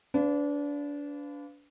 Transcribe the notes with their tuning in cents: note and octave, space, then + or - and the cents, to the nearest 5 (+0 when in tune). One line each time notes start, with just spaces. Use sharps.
D4 -25 B4 +30 F5 +0